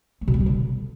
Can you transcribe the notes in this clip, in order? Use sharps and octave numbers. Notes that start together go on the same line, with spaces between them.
A3
B2
G3
C3
D3